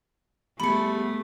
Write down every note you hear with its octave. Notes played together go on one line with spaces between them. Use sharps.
G3 A3 B3 G#4 B5 C#7